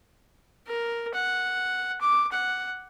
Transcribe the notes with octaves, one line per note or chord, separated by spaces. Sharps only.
A#4
F#5
D6
F#5